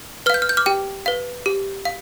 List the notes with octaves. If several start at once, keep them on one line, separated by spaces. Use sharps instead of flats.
B4 F5 F6 G6
F6
G6
D6 F6
G4 G5
B4 F5
G4
F5